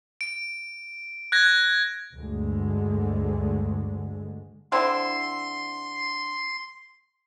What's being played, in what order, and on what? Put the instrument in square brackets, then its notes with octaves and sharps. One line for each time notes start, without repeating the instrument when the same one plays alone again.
[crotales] D7
F#6 G#6 A#6
[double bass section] D2 G2 D3 G#3
[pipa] D3 C4 E4 [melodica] C6